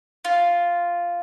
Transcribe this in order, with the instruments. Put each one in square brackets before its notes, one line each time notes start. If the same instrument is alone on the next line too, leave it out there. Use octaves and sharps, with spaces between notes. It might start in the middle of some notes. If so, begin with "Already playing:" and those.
[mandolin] F4